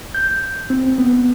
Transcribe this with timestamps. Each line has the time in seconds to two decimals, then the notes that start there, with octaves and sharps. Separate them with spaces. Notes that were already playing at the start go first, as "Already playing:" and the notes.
0.15 G6
0.70 C4
0.98 B3